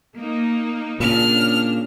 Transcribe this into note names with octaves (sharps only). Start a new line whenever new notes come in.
A#3 D#4
A#2 C#3 D4 F6